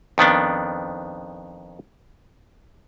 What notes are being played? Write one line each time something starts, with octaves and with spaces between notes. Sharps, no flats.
F2 D#3 B3 D4